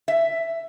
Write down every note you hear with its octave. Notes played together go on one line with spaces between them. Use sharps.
E5